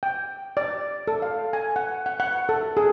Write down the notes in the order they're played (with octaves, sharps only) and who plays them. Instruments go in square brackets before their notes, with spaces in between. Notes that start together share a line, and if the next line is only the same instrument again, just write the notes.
[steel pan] G5
D5
A4
F5
G#5
F#5
F#5
F#5
A4
G#4